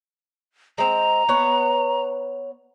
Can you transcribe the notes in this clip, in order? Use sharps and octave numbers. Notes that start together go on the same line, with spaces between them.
G#3 C4 A#5
B3 C#5 F#5